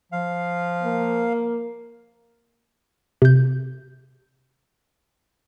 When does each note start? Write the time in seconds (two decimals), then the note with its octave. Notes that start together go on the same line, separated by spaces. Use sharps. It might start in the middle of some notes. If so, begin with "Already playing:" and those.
0.12 F3 F5
0.83 A#3
3.22 C3 G6